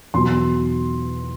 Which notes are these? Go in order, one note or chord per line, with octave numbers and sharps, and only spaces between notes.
E2 B2 F#3 C6